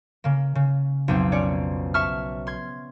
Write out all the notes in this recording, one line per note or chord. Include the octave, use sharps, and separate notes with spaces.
C#3 A#3
C#3
B1 F2 C4
C#4 C#5 D5
E5 A5 C#6 F6
C6 G#6